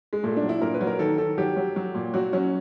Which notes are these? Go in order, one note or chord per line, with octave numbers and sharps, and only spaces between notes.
G#3
A#2 A3
D4
F#3
E4
A#2 A#4
B4
F#3
A#4
D#3 A4
D#3 A4
F#3 G4
F#3
F#3
A#2
F#3 F#4
F#3 C#4